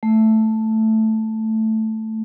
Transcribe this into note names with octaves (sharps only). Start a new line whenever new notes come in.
A3